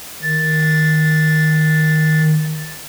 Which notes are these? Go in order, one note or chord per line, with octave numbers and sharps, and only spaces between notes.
D#3 A6